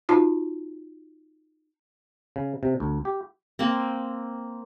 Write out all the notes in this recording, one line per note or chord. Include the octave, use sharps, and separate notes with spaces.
D#4 F4 F#4 A5
C#3
C3
D2
G4
A#3 C4